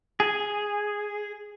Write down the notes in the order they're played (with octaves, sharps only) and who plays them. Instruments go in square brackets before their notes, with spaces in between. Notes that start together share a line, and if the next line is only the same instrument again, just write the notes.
[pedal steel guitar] G#4